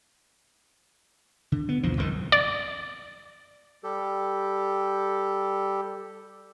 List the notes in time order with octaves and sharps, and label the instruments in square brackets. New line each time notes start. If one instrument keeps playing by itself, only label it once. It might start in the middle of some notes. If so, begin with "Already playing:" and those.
[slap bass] D3
B3
B1 E2 F3
F1 C2 G#2 D#3
[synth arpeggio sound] D5
[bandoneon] G3 G4 A4